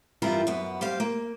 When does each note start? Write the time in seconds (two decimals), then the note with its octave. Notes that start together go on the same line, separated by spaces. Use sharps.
0.22 G2 E3 G3 E4 F4 A#4
0.47 F#2 B3
0.81 G3 G4 C5 F5
1.00 A#3